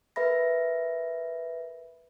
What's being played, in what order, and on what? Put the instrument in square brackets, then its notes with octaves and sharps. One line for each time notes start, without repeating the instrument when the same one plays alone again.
[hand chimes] A#4 B4 E5 B5 A#6